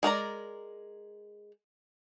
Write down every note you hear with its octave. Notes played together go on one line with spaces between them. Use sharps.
G#3 A#4 D5 A#5